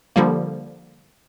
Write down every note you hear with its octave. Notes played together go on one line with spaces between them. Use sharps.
D3 F3 G3 A#3